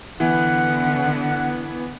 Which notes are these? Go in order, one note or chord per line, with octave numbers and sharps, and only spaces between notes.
D3 E3 B3 F#5